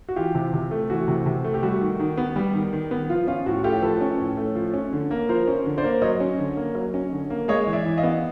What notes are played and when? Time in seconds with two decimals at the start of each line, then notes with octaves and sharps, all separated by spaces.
0.09 F#4
0.16 E3 F4 G4
0.35 C3
0.53 C3
0.71 A3
0.90 E3 F#4
1.08 C3
1.26 C3
1.44 A3
1.54 G4
1.63 G3 F#4
1.81 D#3
1.99 D#3
2.18 B3
2.36 G3
2.54 D#3
2.73 D#3
2.91 B3
3.09 F3 F4
3.27 C#4 F4
3.46 A2 F#4
3.64 A3 F4 G4
3.82 F3 A4 B4
4.01 C#4
4.20 A2
4.37 A3
4.55 F3
4.74 C#4
4.92 D3
5.11 A#3
5.29 F3 A#4 C5
5.48 C#4
5.66 D3
5.78 C5 D5
5.84 A#3
6.02 F#3 C#5 D#5
6.20 C#4
6.38 D3
6.57 A#3
6.75 F#3
6.94 C#4
7.12 D3
7.30 A#3
7.48 G#3 C#5 D#5
7.67 E3
7.73 D5 E5
7.85 E3
7.97 D#5 F5
8.03 B3